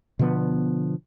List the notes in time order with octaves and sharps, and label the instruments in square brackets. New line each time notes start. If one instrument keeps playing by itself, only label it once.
[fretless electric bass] B2 D3 F3 B3